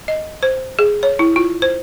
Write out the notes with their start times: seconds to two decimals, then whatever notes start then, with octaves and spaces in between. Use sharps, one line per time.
0.08 D#5
0.43 C5
0.79 G#4
1.03 C#5
1.19 E4
1.36 F4
1.62 C5